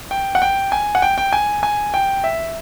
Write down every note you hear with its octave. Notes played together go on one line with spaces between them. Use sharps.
G5
F#5
G5
G#5
F#5
G5
G5
G#5
G#5
G5
E5